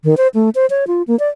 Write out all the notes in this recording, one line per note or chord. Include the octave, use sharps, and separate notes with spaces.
D#3
C5
A3
C5
C#5
F4
A#3
D5